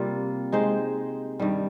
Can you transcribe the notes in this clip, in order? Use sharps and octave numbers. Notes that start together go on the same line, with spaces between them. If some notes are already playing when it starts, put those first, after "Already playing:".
Already playing: C3 G3 A#3 F4
G#3 D#4 G4 C5
G2 D#3 G3